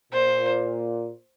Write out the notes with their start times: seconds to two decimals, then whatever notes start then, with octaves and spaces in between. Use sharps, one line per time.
0.13 A#2 C5